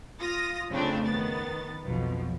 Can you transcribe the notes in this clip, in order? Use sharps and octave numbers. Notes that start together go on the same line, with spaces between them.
F4 D#6 A#6
F2 C#3 A3 C4 D4
D#3 B3 A6
B1 F2 B2 F3